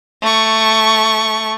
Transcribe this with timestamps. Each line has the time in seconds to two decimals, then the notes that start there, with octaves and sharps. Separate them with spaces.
0.21 A3 C#6